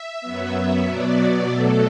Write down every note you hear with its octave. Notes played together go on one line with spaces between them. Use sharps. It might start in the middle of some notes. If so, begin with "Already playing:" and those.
Already playing: E5
F#2 F#3 B3
B2 F#3 B3 D5
B2 F#3 A3 A4